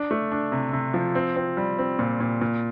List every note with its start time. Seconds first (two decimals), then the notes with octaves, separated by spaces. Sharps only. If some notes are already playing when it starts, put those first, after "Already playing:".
Already playing: D4
0.11 A3
0.31 D4
0.52 C3
0.73 C3
0.94 F3
1.15 C4
1.36 C4
1.57 G3
1.78 C4
1.99 A#2
2.20 A#2
2.41 A#2